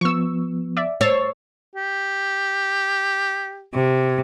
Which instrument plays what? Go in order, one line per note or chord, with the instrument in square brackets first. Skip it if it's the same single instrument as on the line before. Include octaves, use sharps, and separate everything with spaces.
[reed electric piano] F3 B3 [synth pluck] C#6 E6
[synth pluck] D5 E5
[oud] C#5 [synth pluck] E6 A6 C7
[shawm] G4
[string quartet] C3